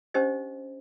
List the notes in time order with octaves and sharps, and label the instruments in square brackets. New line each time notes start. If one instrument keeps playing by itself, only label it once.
[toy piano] C#4 D4 G4 C5 D#5